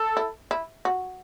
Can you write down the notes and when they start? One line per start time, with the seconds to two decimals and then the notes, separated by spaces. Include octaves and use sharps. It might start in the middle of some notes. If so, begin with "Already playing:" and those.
Already playing: A4
0.17 E4
0.51 E4
0.85 F#4